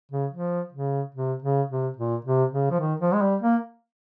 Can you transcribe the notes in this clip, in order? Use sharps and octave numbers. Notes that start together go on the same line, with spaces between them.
C#3
F3
C#3
C3
C#3
C3
A#2
C3
C#3
F3
D#3
F3
G#3
G3
A#3